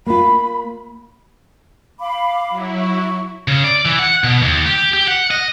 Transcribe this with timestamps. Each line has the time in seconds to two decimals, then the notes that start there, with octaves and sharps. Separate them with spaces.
0.06 A#3 F4 B5
2.00 F5 B5 D6
2.49 F#3 E4
2.80 C#6
3.48 C#3
3.64 D5
3.85 E3
3.99 F#5
4.24 B2
4.42 D#2
4.66 G4
4.93 G4
5.08 F#5
5.31 D#5